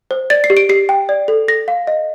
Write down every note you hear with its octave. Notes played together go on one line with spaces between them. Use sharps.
C5
D5 A6
C7
G4
D7
G4 C7
G5
D5
A4
A4 A#6
F5
D#5